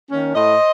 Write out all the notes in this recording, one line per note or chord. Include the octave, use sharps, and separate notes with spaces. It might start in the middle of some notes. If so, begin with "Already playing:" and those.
D#3 A#3 C#4
A2 C5 D#5